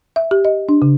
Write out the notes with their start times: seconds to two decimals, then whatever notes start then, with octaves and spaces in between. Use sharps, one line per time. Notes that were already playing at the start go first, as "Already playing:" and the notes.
0.16 E5
0.31 G4
0.45 D#5
0.69 D4
0.82 C#3